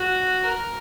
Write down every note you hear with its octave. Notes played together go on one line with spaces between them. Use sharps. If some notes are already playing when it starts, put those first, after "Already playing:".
Already playing: F#4
A#4